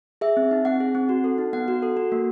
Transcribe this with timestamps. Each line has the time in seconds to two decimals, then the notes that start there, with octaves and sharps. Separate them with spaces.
0.21 G#4 E5
0.37 C4
0.51 D#4
0.65 C4 F#5
0.80 G#4
0.95 C4
1.09 F#4
1.24 A4
1.38 D#4
1.53 B3 F#5
1.68 F#4
1.83 A4
1.97 F#4
2.12 A#3